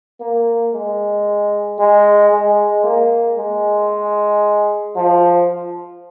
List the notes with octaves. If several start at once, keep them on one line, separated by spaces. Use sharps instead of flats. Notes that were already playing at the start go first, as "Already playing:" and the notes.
A#3
G#3
G#3
G#3
A#3
G#3
F3